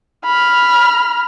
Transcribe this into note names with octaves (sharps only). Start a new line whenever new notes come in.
B5 F6